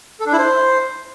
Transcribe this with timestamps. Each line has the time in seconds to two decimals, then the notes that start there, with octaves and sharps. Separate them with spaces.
0.20 A4
0.26 D4
0.32 E4
0.39 C5